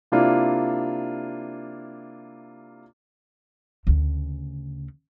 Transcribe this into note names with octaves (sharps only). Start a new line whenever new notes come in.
C3 A#3 D4 E4 F4 D5
D2 C#3